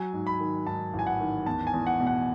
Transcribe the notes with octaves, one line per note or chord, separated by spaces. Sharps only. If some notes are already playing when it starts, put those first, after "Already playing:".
Already playing: F#3 G#5
G#2
B5
D#3
G#2 A5
A1
G#5
F#5
D#3
E2 A5
G#5
E2
F#5
B2
F#5